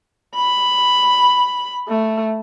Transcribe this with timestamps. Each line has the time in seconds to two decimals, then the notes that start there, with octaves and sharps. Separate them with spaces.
0.35 B5
1.88 A3